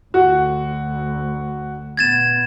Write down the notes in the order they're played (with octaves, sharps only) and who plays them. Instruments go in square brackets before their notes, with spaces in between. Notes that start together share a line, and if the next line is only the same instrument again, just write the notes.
[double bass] D2 [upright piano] F#4
[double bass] A#2 B3 [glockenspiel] G#6 A6 E7